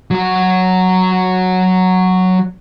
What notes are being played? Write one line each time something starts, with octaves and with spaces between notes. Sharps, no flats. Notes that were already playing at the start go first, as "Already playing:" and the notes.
F#3 F#4